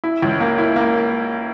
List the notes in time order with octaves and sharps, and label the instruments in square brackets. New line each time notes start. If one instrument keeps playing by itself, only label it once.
[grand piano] E4
C#2
A#3
E4
A#3